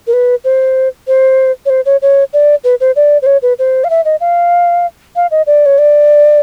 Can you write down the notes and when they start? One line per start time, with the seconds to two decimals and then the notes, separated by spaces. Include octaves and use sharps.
0.07 A#4
0.13 B4
0.44 C5
1.08 C5
1.66 C#5
1.70 C5
1.86 C#5
2.02 C#5
2.33 D5
2.64 B4
2.80 C5
2.96 D5
3.22 C5
3.26 C#5
3.42 B4
3.59 C5
3.84 F5
3.90 E5
4.05 D#5
4.20 F5
5.16 F5
5.31 D#5
5.47 D5
5.66 C#5
5.78 D5